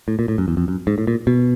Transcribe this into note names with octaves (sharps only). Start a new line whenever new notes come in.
A2
A#2
A2
F#2
E2
F2
F#2
G#2
A2
A#2
B2